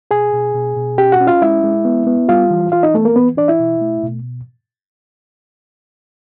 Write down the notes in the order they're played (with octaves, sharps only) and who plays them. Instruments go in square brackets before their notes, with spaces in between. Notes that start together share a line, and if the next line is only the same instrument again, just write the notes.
[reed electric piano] B2 G#4 G#5
B2
B2
B2
C#4 G4 G5
F#4 F#5
C#4
F4 F5
G#3 E4 E5
G#3
B3
B3
G3 F4 F5
E3
E3 F4 F5
D#4 D#5
A3 B3 A4
A#3 A#4
E3 B3 B4
E3 D4 D5
E4 E5
B2
A3
B2